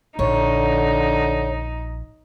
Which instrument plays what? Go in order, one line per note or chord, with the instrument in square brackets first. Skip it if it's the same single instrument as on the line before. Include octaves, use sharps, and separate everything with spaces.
[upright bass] A#1 [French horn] D3 [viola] D#4 [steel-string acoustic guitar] C#5